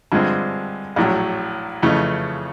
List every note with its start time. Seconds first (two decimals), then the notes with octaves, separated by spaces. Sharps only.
0.12 G2 D3 F3 G#3 C4
0.96 A#1 A2 F#3
1.83 F2 C#3 E3 A3